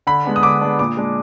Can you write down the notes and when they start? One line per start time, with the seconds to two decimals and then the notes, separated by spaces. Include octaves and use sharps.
0.07 D3 B5
0.25 G#3 B3 D4
0.36 D#6
0.43 D3 D6
0.61 G#3 B3 D4
0.79 A#2 D6
0.97 G#3 D4